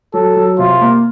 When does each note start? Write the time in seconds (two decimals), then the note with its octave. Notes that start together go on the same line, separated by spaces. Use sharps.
0.14 F#3 A4
0.36 F#3
0.59 C3 F4
0.81 A#3